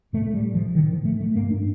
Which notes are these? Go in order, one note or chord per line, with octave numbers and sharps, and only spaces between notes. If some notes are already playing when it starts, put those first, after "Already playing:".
A2 A3
G3
F3
A2 D#3
F3
A3
A3
G2 A#3
D4